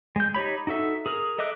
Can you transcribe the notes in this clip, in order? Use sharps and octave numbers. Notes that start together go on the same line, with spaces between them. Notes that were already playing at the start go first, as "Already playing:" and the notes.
G#3 G6
D#4 G4 C#5 B5
D#4 F#4 A4 E5
G#4 A#4 F6
A4 D#5 E5 D6 F#6